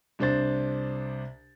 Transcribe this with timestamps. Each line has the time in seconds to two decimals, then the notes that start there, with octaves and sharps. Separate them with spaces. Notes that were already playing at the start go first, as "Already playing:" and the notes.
0.19 C2 D4 C5 A6